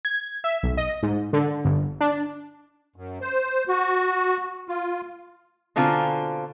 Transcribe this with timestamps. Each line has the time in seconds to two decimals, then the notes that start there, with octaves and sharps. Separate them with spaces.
0.05 G#6
0.44 E5
0.63 B1
0.77 D#5
1.03 G#2
1.33 D3
1.65 G1
2.01 D4
2.96 F#2
3.21 C5
3.68 F#4
4.69 F4
5.76 B2 D3 C4 F4 G#5 A#5